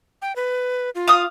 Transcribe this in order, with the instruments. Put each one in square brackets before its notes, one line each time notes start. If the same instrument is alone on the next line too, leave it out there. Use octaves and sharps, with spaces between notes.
[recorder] G5
B4
F4
[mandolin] F5 D#6